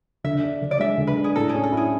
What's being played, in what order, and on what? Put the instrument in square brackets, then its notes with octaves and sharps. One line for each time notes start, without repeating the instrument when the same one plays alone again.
[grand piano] D3 [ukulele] E5
[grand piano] D4
D3
[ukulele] D5
[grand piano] G#3 [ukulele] E5
[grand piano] D3
[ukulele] B4
[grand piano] D4
[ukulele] G#4
[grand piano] A2 [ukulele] A4
[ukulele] G#4
[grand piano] C#4
[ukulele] A4
[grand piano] E4
[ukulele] G#4